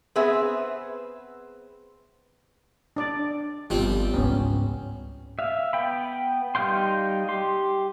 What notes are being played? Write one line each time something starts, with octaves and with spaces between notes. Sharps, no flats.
B3 C4 G#4 B4 E5
D4 D5
G1 F3 G3 C4
C#2 G#2 B3 C#4
E5 F5
B3 G5 B5
G3 D#4 F5 G5 C6
G4 C6